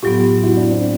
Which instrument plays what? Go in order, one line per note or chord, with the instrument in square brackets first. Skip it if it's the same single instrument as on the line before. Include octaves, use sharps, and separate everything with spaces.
[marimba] A2 F#3 B3 [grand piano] F4 G4
[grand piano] E4 F#4
D4 E4
C4 D4